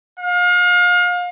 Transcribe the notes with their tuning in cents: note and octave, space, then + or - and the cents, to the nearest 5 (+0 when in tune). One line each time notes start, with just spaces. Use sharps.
F5 +35